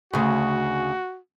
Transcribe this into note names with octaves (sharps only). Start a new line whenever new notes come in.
D2 C#3 F#4